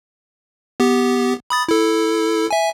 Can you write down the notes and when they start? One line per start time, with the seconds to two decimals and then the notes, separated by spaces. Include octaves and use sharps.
0.80 B3 G4
1.50 B5 D#6 A6
1.69 E4 A4
2.51 E5 G#5